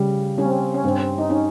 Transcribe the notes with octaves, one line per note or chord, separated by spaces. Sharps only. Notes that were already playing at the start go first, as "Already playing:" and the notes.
Already playing: C#3 G3
G3 C#4
C4
C#4
C#4
G2 C4
D#4
C#4 D#4